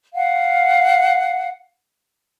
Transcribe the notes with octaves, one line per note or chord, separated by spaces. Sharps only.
F5 F#5